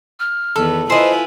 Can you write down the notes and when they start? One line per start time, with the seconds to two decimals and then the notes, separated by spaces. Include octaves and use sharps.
0.20 F6
0.56 E2 D#3 A4 B4
0.90 E4 F4 B4 C5 D#5 G#5